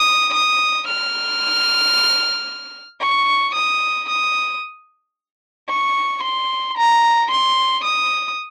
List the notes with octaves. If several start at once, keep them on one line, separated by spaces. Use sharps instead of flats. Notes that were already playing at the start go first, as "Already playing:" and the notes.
Already playing: D#6
D#6
F6
C#6
D#6
D#6
C#6
C6
A#5
C6
D#6